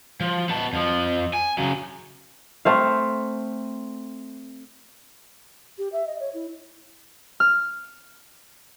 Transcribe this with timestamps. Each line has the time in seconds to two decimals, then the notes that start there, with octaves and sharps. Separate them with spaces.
0.20 F3
0.49 B3 A5
0.73 F2 F3
1.33 G#5
1.58 C#3 F#3
2.65 A3 C4 F5
5.78 G4
5.93 E5
6.07 D#5
6.20 C#5
6.34 E4
7.40 F6